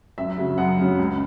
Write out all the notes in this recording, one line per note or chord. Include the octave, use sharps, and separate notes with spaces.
F#2 E5
C#3 F#3
F#2 F#5
C#3 F#3
C#2